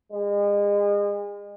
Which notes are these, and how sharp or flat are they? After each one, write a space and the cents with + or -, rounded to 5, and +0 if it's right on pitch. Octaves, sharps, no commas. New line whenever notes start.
G#3 -35